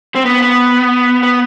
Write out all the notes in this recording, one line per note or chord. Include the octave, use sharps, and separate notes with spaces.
C4
B3
B3
B3